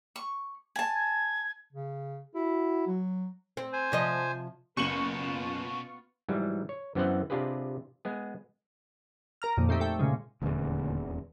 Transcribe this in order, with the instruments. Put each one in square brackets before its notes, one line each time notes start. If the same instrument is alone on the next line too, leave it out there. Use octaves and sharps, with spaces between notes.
[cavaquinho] C#6
G#5 A5
[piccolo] G#6
[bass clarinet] C#3
[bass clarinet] E4 [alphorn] F#4
[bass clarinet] F#3
[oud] C4
[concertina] C5 G#5
[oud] C3 F3 D#5
[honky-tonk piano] F#1 D#7 F#7 [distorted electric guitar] B2 A4 [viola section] B3 F4 [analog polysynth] C#6
[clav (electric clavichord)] G#2 E3 F#3 G3
C#5
F#2 E3 B3 C4 C5 F#5
C3 D4 F4 G4 G#4 B4
G#3 B3 G#4
[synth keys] A#4 A#5 F6
F2 A#2 D#3
A3 C4 D#4 G4
A3 G5
A#2 C#3 G#3
[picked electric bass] D#1 E2 [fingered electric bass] A#2 D3 A3